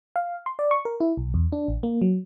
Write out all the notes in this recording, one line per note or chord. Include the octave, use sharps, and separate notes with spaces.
F5
C6
D5
C#6
A#4
E4
B1
E2
D4
A1
A#3
F#3